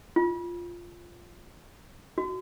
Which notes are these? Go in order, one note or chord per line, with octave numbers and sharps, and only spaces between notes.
F4
F#4